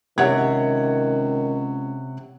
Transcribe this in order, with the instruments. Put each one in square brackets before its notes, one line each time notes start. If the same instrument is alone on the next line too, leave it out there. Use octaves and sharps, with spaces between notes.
[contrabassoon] C#2 [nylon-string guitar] C3 [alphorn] D#3 [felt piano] C#5 F#5 G#6